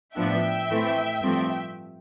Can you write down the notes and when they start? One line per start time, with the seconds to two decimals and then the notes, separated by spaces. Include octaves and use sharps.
0.16 A2 F3 B3 D4 E5 G5
0.69 A2 E3 A3 C4
1.22 G2 F3 A3 C4